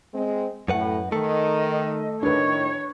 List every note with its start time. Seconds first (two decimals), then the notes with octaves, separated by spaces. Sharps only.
0.14 G#3 C4
0.68 F#2 A2 B4 F#5
1.12 D#3 A3 A4 D#5
2.23 A2 D#3 D4 B4 C#5